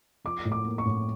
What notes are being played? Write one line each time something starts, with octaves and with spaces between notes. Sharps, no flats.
F3 D6
A2
D6
A#3
C#6
A2